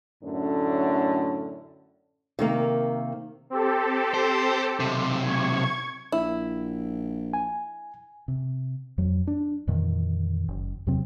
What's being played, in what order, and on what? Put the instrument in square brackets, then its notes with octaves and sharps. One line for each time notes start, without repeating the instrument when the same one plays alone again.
[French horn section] F#2 A2 D3 A3 C#4
[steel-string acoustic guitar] C3 D#3 A#3
[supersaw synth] C4 G4 A4
[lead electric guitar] C5
B1 C3
[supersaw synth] C#6 G#6
[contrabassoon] A#1 [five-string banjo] E4
[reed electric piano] G#5
[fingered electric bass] C3
F2 F#3
D4
F2 A#2 D#3 E3
F#1
E2 C3 F#3 C4